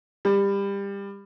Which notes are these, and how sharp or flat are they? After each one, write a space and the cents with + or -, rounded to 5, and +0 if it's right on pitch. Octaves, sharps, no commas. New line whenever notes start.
G3 +25